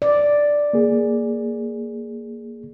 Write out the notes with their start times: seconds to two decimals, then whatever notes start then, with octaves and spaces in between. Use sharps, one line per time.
0.02 D5
0.73 A#3 G#4